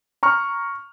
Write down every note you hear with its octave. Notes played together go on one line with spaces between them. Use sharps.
A#5 C#6 F6